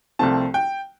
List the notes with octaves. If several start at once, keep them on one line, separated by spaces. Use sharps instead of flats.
C2 C3 F3 A3 C4 A5
G5